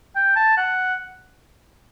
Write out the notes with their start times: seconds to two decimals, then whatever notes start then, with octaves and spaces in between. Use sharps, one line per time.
0.16 G5
0.36 A5
0.57 F#5